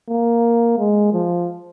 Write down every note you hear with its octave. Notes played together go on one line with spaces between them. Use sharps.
A#3
G#3
F3